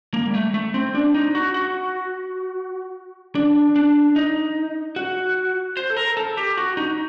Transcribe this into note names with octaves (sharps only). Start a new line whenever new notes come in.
A#3
G3
A3
A3
C4
D4
D#4
F#4
F#4
D4
D4
D#4
F#4
C5
A4
A#4
A4
G4
F#4
D#4